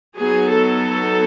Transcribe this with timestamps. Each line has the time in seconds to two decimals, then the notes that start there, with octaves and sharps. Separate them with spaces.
0.17 F#3 B3 D#4 G#4
0.52 A4